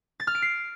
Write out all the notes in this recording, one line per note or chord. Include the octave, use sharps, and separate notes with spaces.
A6
F6
D7
C7